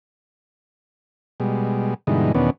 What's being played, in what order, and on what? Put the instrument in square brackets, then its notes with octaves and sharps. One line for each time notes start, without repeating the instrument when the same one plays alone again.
[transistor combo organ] B2 G3 G#3
G2 B2 D3 E3 G#3 D#4
E2 B2 D#3 B3 C#4 D4